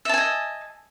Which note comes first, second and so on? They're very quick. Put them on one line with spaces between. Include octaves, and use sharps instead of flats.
E5 A5 G#5 D#5